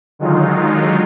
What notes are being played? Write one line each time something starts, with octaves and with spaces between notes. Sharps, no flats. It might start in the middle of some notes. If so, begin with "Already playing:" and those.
D3 D#3 F#3 G#3 D#4 F4